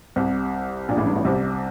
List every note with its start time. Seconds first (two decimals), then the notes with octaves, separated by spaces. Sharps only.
0.16 C2 C3
0.89 A#1 A#2
0.97 A1 A2
1.07 G2
1.16 A1 A2
1.25 C2 C3